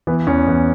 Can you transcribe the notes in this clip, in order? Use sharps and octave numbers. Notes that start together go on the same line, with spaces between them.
E3 B3
E2 C#4
E2